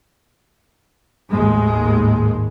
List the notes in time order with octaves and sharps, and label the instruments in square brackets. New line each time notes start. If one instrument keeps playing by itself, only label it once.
[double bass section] G#1 D#2 A2 G#3